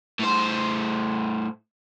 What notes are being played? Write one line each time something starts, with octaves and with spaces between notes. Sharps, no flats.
A2 C5